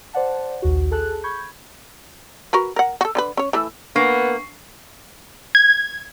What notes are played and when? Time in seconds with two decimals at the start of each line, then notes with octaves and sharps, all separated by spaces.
0.13 C5 D5 F#5 A5
0.62 A#1 D#2 F#4
0.91 G#4 A4 A5 F#6
1.24 B5 C#6 G6 G#6
2.53 F#4 A#4 B4
2.76 A#4 F#5
3.01 F#4 A4
3.15 D3 C#4 B4
3.37 C#4 C#5
3.53 E3 A3 E4
3.96 A#3 B3 D4 C#6 C7
5.55 G#6